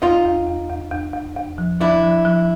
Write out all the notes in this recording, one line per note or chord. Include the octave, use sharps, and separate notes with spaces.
E2 D#4 F4
E2
E2
E2
E2
E2
E2
F3
F3 D4 E4
F3
F3